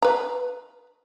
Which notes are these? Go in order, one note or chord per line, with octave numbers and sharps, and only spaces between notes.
B4 A#5